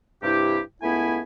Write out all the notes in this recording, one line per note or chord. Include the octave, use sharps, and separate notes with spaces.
G2 C3 E4 G4
C#2 A3 B3 E4 G#5 B5